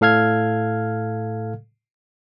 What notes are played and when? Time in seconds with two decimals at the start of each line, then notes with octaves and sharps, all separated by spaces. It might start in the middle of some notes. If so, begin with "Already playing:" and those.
0.01 A2 A4 F5 F6 G#6